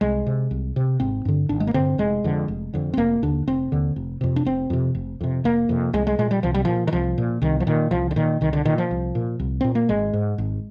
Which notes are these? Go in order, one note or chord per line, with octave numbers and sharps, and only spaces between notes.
C2 G#3
C3
C2
C3
G#1 C4
G2 D3
G#1 D4
G#3
A#3
G2 D3 C4
F1 G#3
F2 D3
F1
F2 D3
C4
F1 A#3
D#2 D3 D4
F1 C4
D#2 D3
F1
F2 C3
D4
F1 C4
F2 C3
F1
F2 C3
F1 A#3
F2 C3
C2 G#3
G#3
A#2 G#3
G3
C2 F3
G3
A#2 F3
D#3
C2 F3
A#2
C2 D#3
F3
A#2 D#3
C2 F3
D3
A#2 D#3
C2 D#3
D3
A#2 D#3
F3
C2
A#2
C2
A#2 C4
A#3
G#1 G#3
G#2
G#1